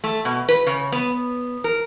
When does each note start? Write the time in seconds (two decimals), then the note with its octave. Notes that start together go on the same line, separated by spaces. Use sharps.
0.04 A3
0.25 B2
0.49 B4
0.67 C#3
0.92 B3
1.64 A#4